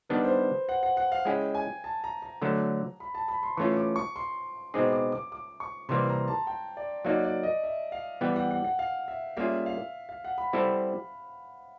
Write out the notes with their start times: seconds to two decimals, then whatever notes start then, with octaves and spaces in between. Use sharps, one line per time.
0.09 D#3 G3 B3 D4 B4
0.25 C5
0.69 F#5
0.83 F#5
0.97 F#5
1.12 F5
1.25 G#3 C#4 E4 G#4 G5
1.54 G#5
1.84 A5
2.04 A#5
2.22 A#5
2.42 D3 F#3 A3
3.00 B5
3.15 A5
3.28 B5
3.43 C6
3.57 E3 A3 C#4 F4 C#6
3.77 D6
3.96 C#6
4.16 C6
4.74 B2 G#3 C4 D#4 G#4 D6
4.93 D6
5.12 D6
5.32 D6
5.60 C#6
5.89 C3 E3 G3 A#3 C6
6.09 A#5
6.28 A5
6.47 G5
6.77 D5
7.05 F#3 A#3 D#4 F#4 D5
7.25 D5
7.43 D#5
7.64 E5
7.92 F5
8.21 E3 G3 B3 G5
8.36 F#5
8.51 F#5
8.64 F#5
8.79 F5
9.08 E5
9.37 G3 A#3 C#4 F4 G#4 E5
9.66 F5
10.09 F5
10.24 F#5
10.38 B5
10.53 G3 C4 E4 A4